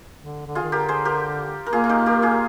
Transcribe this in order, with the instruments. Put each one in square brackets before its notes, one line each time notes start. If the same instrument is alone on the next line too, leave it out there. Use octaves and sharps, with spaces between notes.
[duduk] D3
D3
[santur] F4 G#4
[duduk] D#3
[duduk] D3 [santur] G4 A#4
[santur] G#4 C5
G4 A#4
A#4
[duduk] A#3 [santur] F4 G#4
[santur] F4
D#4 G4
G4 A#4
F4 G#4